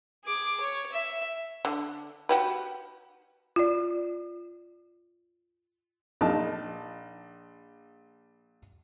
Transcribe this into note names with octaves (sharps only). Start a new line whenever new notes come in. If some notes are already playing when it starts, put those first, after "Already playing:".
G#4 D6
C#5
E5
D3
F#4 G4 B4
F4 D5
A#1 D#4 A5